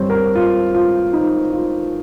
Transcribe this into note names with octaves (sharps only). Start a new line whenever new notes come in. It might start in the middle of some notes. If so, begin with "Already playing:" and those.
Already playing: G2 G3 C4 C5 C#5
A#4
F4
F4
D#4
F4